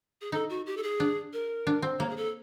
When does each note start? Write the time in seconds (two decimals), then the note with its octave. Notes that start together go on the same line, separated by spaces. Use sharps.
0.21 G#4
0.32 D#4 A4
0.50 F#4
0.66 G4
0.77 A4
0.83 G#4
1.00 D4
1.33 A#4
1.67 D4
1.82 C4
1.99 A#3 C#5
2.10 G#4
2.17 A4